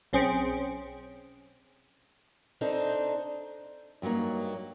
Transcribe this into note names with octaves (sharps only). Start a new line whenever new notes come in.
B1 C4 C#4 G#4 C5 D7
C4 D4 D#4 A4
G2 F#3 G3 A#3 D#4